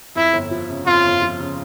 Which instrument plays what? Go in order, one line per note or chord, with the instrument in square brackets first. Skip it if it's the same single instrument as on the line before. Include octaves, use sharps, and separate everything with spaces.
[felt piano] F2 [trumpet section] E4
[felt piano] G1
F3
C#3
[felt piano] F2 [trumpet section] F4
[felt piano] G1
F3
C#3